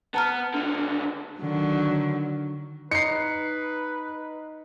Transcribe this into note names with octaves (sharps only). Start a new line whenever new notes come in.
B3 A5 A#5 F6
C#2 D3
D3 D#3 F#3
D#4 B4 C7 C#7